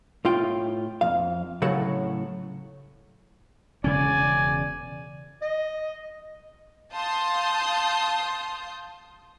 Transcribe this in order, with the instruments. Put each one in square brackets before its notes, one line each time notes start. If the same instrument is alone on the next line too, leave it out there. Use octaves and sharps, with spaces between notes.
[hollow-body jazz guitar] A2 F4 G5
F2 F5
A2 C#3 F#3 A4 F#5
[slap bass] E1 C#3 C#4 [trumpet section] D5 G#5
[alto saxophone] D#5
[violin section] F5 A5 C6 D#6 G6